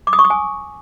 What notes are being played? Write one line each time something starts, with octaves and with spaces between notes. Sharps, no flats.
D6
D#6
C#6
D#6
G#5